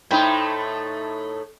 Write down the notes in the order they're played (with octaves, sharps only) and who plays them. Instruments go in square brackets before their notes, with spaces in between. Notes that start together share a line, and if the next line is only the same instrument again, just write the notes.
[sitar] A2 A3 D#4 [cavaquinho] C5 G5 B5